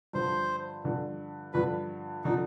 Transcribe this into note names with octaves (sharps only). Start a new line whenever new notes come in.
G2 D3 F3 C5
G2 D3 F3
G2 D3 F3 B4
D3 F3 D#4